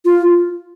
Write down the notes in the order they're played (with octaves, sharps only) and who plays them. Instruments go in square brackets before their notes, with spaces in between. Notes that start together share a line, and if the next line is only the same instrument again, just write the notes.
[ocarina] F4